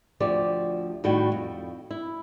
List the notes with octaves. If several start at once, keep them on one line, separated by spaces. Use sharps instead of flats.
D2 F3 G4 D5
A2 D#3 G3 F#4 G5
F2
E4